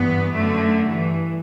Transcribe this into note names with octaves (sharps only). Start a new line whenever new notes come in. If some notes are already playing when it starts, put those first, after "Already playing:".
Already playing: G2 E3 B3
F#2 D3 A3
G2
E3